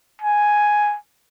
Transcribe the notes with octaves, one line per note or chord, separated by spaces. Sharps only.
G#5